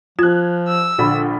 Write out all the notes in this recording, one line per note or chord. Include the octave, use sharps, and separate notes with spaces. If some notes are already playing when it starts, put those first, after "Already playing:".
F3 F4 F#6 G#6
E6
A#1 D3 B5